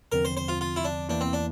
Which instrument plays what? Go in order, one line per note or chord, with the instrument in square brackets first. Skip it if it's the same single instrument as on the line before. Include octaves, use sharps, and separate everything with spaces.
[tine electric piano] E2 D3 F3 C4 [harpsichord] A#4
[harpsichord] C5
C5
F4
F4
E4
D4
[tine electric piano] E2 E3 A#3 E4 [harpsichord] D4
[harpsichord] C4
D4